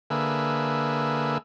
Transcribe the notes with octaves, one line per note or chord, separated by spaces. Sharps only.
D3 A#3 G#4 B4 E5